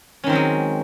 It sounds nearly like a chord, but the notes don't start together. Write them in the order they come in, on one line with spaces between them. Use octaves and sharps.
C#4 D#3 C4 F#3 G#3